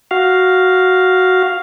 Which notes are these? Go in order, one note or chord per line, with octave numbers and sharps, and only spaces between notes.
F#4 F5